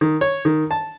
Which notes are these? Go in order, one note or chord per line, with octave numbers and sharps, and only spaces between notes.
D#3
C#5
D#3
A5